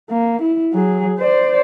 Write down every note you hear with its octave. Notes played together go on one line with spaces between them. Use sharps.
A#3
E4
F#3 G#4
C5 D5